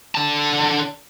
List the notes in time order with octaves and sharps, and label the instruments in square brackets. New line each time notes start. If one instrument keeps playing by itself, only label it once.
[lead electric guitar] D3 A5